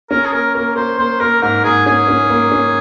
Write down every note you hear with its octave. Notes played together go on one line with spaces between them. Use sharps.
C#4 A#4
G#4
A#3 A#4
A#3 A#4
A#3 C5
A#3 C5
A#3 A#4
G#2 A#4
G#2 G#4
C#4 G#4
C#4
A#3
C#4